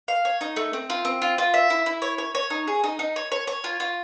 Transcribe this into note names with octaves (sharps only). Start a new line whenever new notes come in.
F5
C#5
D#4
A3
C4
F4
C4
F4
F4
E5
E4
E4
C#5
C#5
C#5
D#4
G#4
D#4
D#4
C#5
C#5
C#5
F4
F4